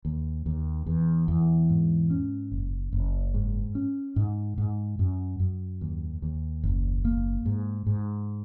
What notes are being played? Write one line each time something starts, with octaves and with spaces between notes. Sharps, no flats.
D#2
D#2
E2
E2
G#2
C#4
F#1
F#1
G#2
C#4
G#2
G#2
F#2
F#2
D#2
D#2
F#1
A#3
G#2
G#2